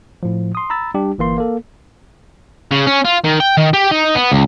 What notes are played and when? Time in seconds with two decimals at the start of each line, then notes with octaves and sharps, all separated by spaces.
0.23 A2 F3
0.55 C6 D#6
0.70 A#5 B5 E6 A6
0.95 G3 D4 G4
1.18 G1 E3 A#3 C6
1.38 A#3 A4
2.71 C#3
2.87 C#4
3.05 F4
3.24 D#3
3.40 G5
3.57 D#3
3.73 G4
3.91 D#4
4.15 B3
4.32 C#2